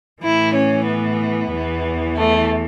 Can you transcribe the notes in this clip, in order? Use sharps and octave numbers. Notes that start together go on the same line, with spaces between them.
A2 E3 E4
C#4
B3
E2 E3
A3